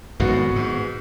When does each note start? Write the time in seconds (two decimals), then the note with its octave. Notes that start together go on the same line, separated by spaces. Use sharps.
0.20 G#1 F#2 A2 B3 F#4
0.56 G#2